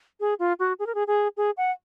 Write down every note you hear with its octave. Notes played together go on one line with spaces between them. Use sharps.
G#4
F4
F#4
G#4
A#4
G#4
G#4
G#4
F#5